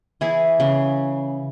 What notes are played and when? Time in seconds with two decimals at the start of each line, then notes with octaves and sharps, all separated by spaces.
0.21 E3 E4 G#4
0.60 C#3